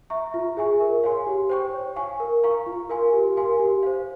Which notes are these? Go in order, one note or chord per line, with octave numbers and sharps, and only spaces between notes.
E5 A#5 C#6
F4
G#4 E5 G#5 C#6
A#4
C#5 F5 G#5 C6
G4
C5 G5 C#6
C#5
F5 G#5 C#6
A#4
F5 A#5 C#6
F4
A#4 F5 G#5 C6
G4
A#4 F5 G#5 C6
G4
C5 F5